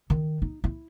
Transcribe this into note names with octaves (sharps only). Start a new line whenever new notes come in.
D#3
D#4
E4